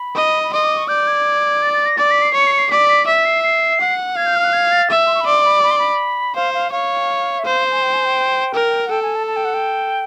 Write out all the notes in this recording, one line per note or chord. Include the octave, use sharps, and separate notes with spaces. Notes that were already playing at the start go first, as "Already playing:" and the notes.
Already playing: B5
D#5
B5
D#5 C6
D6
C#6
D5 G6
G#6
A6
A6
A#6
D5 A6
B6
C7
C#5 C#7
C7
C#7
C7
D5 B6
B6
E5 B6
C7
C7
F#5
F5 G#6
G6
F6
F#6
G#6
A6
E5
C6
C#6
B5
D5 C6
B5
B5
C6
B5
C5 F5
F5
C#5 F5
E5
C5 F5
G#5
G5
G#5
G5
A#4
F#5
A4 G5
G#5
A5
A5
G5
F#5
G5